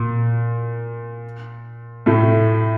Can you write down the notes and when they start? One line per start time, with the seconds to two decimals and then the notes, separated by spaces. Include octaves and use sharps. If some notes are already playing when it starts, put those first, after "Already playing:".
Already playing: A#2
2.06 A2 A3